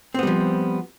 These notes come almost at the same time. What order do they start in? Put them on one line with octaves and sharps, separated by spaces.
C4 B3 G3 F3